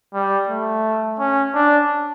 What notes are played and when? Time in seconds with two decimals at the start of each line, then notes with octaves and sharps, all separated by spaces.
0.14 G3
0.49 A3
1.19 C#4
1.55 D4